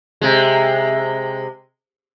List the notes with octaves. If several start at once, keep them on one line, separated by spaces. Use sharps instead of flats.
C3 G#3